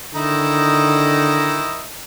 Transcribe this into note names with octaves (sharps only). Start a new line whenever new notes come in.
D3 D#3 D#4 E4